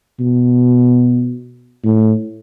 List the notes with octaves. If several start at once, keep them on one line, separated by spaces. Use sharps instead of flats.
B2
A2